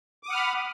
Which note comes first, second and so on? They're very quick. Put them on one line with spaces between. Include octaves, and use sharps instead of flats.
D6 D#6 F#5 F6 B5